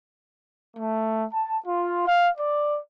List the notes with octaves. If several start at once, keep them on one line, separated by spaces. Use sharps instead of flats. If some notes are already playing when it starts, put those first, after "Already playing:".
A3
A5
F4
F5
D5